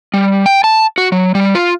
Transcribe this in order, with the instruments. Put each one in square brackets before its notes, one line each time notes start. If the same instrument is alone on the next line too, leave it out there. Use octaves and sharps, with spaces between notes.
[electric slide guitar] G3
G5
A5
F#4
F#3
G3
F4